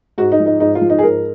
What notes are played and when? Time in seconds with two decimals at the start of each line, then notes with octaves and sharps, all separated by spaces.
0.18 G#2 F#4
0.32 D#4
0.40 F3
0.46 D#4
0.60 G#2 D#4
0.75 F4
0.81 F3
0.90 D#4
0.99 G#4
1.03 G#2 A#4